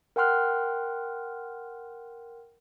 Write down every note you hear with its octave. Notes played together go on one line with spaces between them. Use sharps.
A#4 F#5 G5 C6 F6 F#6